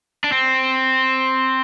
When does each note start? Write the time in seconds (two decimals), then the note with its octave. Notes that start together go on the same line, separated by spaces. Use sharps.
0.24 D4
0.32 C4